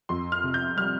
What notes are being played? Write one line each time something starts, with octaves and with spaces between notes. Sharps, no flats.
F2 C6
F6
C3
G6
G3 F6